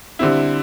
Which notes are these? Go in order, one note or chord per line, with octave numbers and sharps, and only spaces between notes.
D3 G3 C4 E4